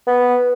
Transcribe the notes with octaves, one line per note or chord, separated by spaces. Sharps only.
B3